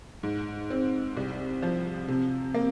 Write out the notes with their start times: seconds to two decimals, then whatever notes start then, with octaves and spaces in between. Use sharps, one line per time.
0.23 G#2
0.70 C4
1.17 C2
1.62 F3
2.08 C3
2.54 A#3